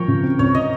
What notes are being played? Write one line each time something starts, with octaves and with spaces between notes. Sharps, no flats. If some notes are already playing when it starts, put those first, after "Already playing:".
Already playing: F3 A#4 C#5 G5
C#3
C4
C#2 C#5
C3 D#5